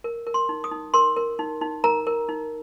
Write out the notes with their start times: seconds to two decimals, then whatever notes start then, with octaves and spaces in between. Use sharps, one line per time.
0.04 A#4
0.27 A#4
0.34 C6
0.49 D#4
0.64 D#6
0.71 D#4
0.94 A#4 C6
1.17 A#4
1.39 D#4
1.61 D#4
1.84 A#4 A#5
2.07 A#4
2.29 D#4